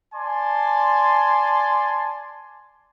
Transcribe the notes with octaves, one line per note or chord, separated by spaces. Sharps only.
D5 G#5 A5 C6